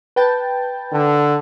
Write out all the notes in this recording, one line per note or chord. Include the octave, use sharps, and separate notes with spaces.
B4 G5 A5
D3